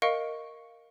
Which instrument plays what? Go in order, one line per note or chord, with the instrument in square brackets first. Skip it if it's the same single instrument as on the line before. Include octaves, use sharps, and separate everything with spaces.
[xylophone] A#4 D#5 F5 C#6 C#7 D7